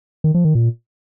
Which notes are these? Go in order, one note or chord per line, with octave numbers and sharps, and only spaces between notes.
D#3
F3
D#3
A#2